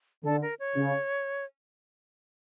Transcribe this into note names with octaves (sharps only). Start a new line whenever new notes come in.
D3 A4
A#4
C#5
C#3